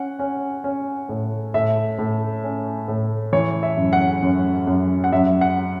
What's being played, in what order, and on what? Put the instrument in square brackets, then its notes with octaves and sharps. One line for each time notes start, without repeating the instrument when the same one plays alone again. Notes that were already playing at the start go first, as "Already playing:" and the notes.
Already playing: [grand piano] C#4 F#5
C#4
C#4
A2
A2 E5
A2
C#4
A2
E3 C#5
E5
F#2
F#5
F#2
F#2
F#5
F#2 E5
F#5